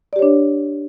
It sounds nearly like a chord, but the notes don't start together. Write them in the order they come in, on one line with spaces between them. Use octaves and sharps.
D5 G4 C#5 D4